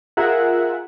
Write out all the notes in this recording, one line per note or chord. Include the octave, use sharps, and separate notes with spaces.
F4 G#4 A#4 E5 F#5